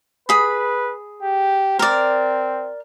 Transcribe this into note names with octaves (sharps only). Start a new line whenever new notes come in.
G#4 B4 B5
G4
C4 A#4 D5